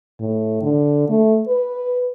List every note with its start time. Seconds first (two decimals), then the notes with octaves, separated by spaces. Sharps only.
0.20 A2
0.62 D3
1.09 A3
1.48 B4